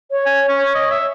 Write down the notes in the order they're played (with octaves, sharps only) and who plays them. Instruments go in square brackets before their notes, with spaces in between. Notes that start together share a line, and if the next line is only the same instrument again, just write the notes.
[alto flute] C#5
[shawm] G#5
C#4
D#5
E5